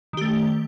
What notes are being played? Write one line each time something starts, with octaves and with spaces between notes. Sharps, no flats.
D#3 A3 G4